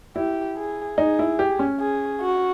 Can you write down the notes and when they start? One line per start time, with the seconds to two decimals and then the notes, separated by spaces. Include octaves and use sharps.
0.16 E4 G4
0.57 G#4
0.98 D#4 G#4
1.19 E4
1.39 G4
1.59 C#4
1.80 G#4
2.21 F#4